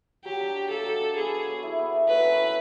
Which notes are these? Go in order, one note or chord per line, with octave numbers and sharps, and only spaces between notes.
F#3 G4
D4
F#4
A#3 A4
F#3
D4
B3 G#4
A4
C#5
E4
B3
A4
F#3 B4
C#4
E4